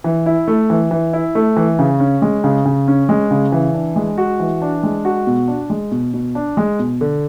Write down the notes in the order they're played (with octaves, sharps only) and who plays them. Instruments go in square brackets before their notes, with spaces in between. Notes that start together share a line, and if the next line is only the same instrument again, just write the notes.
[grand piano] E3
E4
A3
E3
E3
E4
A3
E3
C#3
C#4
G#3
C#3
C#3
C#4
G#3
C#3
E3
D4
G#3
F#4
E3
D4
G#3
F#4
B2
D4
G#3
B2
B2
D4
G#3
B2
D3